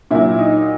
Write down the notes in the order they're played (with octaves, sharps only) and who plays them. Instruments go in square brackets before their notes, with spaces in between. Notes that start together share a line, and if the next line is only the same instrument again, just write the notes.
[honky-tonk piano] A#2 F#3 E4
D#4